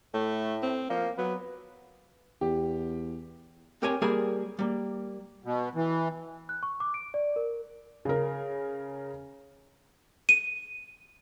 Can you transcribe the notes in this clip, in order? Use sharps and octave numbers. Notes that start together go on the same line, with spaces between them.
A2 A3
C4
F3 A#3
F#3 B3
E2 G4
C4 G4 A#4 C#5 G5 G#5
G3 A#3 G#4 A#4 G#5
G3 A#3
B2
E3
F#6
C#6
D6
D7
D5
A#4
C#3 A#4
D#7